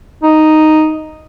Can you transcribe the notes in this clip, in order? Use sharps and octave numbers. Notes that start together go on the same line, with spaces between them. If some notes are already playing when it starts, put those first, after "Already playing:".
D#4